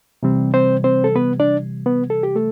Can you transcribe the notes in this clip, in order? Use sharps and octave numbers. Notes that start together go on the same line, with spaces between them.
C3 E3 G3 C4
C4 C5
C4 C5
A4
B3 B4
D4 D5
B3 B4
A4
G4
A3 A4